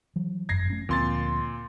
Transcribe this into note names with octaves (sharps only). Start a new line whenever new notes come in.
E3 F#3
G1 F#2 G#6 A#6 C7
A3 C#4
D2 A#2 F3 C4 C6 A6